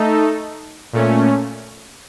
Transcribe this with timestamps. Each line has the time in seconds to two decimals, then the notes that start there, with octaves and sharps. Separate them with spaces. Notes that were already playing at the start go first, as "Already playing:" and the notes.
Already playing: A3 D#4 A4
0.93 A#2 A3 C#4